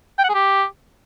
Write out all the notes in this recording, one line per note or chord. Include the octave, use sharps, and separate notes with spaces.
G5
F#5
G#4
G4